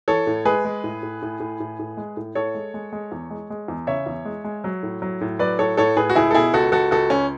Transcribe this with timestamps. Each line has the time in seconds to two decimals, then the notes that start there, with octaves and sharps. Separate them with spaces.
0.08 E3 A4 C#5
0.27 A2
0.45 G#3 G#4 B4
0.65 G#3
0.84 A2
1.03 A2
1.22 A2
1.40 A2
1.60 A2
1.79 A2
1.97 G#3
2.17 A2
2.35 A2 A4 C#5
2.55 G#3
2.74 G#3
2.93 G#3
3.12 E2
3.30 G#3
3.50 G#3
3.68 E2
3.87 C#3 C#5 E5
4.06 E2
4.25 G#3
4.44 G#3
4.64 F#3
4.83 A2
5.02 F#3
5.21 A2
5.39 F#3 B4 D5
5.59 A2 A4 C#5
5.77 A2 A4 C#5
5.97 A2 G#4 B4
6.10 F#4
6.15 C#2 E4 G#4
6.31 A4
6.34 B2 E4 G#4
6.54 C#2 F#4 A4
6.72 C#2 F#4 A4
6.91 C#2 F#4 A4
7.10 C#2 C#4